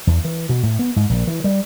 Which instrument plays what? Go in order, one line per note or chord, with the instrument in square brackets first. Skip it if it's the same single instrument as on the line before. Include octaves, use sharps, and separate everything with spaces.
[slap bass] E2
E3
B2
A2
B3
G#2
A#1
E3
G3